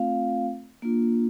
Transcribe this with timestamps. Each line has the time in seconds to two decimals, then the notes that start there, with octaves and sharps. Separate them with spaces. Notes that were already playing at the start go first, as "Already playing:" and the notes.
Already playing: A3 C4 F4 F5
0.82 A#3 D4 F4